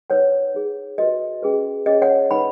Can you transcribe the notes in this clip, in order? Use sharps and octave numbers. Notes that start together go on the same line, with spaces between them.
D#4 B4 C#5 F#5
D#4 G#4 C#5
F#4 B4 D#5
C#4 G#4 B4
C#4 G#4 C#5 D#5
C#5 F#5
D#4 B4 F#5 B5